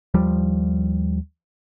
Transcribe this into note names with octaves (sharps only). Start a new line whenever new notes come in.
D#2 F3 G3